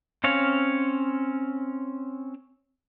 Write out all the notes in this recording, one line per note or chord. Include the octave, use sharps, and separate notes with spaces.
C4 C#4 C#5 F5